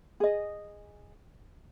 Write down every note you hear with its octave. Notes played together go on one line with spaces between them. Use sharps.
G#4 D#5